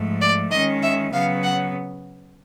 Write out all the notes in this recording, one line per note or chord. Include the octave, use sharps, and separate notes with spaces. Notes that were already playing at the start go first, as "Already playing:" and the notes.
Already playing: G#2 F3 A3
D5
D#3 G#3 C#4 D#5
E5
C#3 F#3 B3 F5
F#5